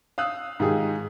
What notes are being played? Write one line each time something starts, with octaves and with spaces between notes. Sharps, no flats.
F5 D#6 E6 F#6
G#2 D#3 F4 G4 G#4